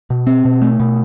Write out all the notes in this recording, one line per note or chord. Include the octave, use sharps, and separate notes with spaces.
B2
C4
B2
A3
B2